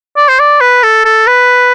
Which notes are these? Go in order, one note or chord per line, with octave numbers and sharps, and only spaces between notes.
D5
C5
D5
B4
A4
A4
B4